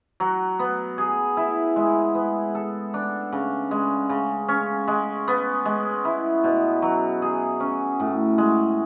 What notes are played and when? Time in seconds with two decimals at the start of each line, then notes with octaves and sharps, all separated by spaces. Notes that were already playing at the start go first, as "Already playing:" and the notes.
0.20 F#3
0.59 B3
0.98 G#4
1.37 E4
1.76 G#3
2.15 B3
2.55 A4
2.94 D4
3.32 C#3
3.71 G#3
4.10 C#3
4.48 C#4
4.88 G#3
5.28 B3
5.65 G#3
6.05 E4
6.44 B2
6.82 F#3
7.22 G#4
7.60 C#4
8.00 A2
8.38 G#3